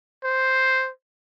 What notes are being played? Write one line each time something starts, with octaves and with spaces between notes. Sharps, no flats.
C5